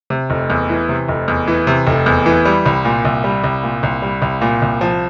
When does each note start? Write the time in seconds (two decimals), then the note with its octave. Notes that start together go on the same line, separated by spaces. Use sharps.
0.10 C3
0.30 F1
0.50 E2
0.69 E3
0.89 C3
1.08 F1
1.28 E2
1.48 E3
1.67 C3
1.87 F1
2.06 E2
2.26 E3
2.45 G3
2.66 C2
2.85 A#2
3.05 C2
3.24 G3
3.44 C2
3.63 A#2
3.83 C2
4.02 G3
4.22 C2
4.41 A#2
4.62 C2
4.81 F3